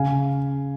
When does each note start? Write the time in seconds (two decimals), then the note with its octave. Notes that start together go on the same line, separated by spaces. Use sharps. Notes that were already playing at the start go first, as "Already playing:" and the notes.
Already playing: C#3 F5 G#5